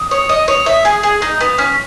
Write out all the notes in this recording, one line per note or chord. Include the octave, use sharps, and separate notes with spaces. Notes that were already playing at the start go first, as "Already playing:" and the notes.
Already playing: D#6
C#5
D#5
C#5
E5
G#4
G#4
D#4
B3
C#4